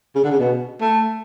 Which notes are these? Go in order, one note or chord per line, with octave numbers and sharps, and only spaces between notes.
C#3
D3
C#3
B2
A3